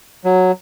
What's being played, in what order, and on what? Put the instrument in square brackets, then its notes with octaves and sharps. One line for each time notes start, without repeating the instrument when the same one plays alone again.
[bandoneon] F#3